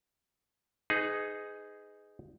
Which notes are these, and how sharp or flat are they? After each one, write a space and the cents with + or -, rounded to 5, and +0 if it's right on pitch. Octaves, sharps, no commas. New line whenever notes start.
D#4 +0 G#4 +0 B4 +40